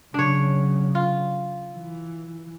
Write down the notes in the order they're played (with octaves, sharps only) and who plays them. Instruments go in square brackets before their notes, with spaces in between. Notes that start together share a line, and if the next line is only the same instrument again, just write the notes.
[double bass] C#3 F#3 [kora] D4 C#5
[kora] F4
[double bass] E3